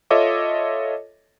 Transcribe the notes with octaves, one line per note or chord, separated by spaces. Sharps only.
F4 A4 C#5 D#5 E5 D6